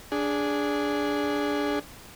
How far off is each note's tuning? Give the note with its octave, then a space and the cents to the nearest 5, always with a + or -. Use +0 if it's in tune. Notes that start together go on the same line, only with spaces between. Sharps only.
D4 -10 G#4 +0